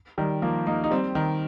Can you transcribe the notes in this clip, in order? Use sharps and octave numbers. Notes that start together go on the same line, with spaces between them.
D#3 G3
F3 A#3
A#3 D#4
D#4
G3 C4
D#3